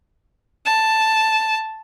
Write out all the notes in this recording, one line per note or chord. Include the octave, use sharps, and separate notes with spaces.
A5